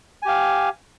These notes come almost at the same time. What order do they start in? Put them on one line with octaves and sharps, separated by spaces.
G#5 G4 F5